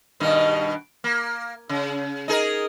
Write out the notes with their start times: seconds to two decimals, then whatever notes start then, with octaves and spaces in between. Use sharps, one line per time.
0.20 G2 B2 D#3
1.04 A#3
1.69 C#3
2.28 D#4 G#4 A#4